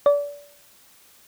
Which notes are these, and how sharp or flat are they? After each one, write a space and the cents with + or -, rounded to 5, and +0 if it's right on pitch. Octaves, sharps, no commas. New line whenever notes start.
D5 -30